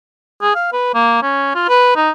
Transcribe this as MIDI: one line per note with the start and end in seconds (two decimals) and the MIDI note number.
0.42 0.53 68
0.55 0.68 77
0.73 0.94 71
0.94 1.18 58
1.22 1.54 61
1.55 1.65 65
1.69 1.94 71
1.96 2.10 63